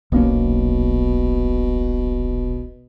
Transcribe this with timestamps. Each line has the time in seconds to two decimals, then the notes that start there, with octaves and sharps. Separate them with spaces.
0.12 D#1 B1 B2 A#3 C#4